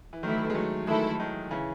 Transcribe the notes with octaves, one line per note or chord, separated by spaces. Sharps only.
E3
D#3 E3 F#3 A3 E4
G#3
F#3 A3
D#3 E3 G#3 A3 E4 A4
D#3 F#3
C#3 E3